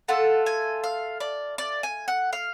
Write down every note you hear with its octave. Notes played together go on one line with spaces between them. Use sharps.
A3 F4 A4 F#5
G#5
F5
D5
D5
G#5
F#5
F5